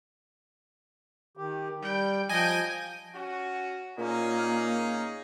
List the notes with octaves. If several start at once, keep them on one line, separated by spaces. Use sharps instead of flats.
D#3 G4
G3 G5
F3 D#5 G5 G#5
C#4 F#4
A#2 A#3 C#4 D#4 G#4